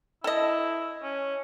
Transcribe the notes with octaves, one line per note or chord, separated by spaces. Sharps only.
E4 A4 D#5
C#4